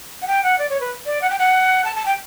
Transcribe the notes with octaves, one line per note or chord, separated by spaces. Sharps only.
F#5
G5
F#5
D5
C#5
B4
D5
F#5
G5
F#5
A5
A5
G5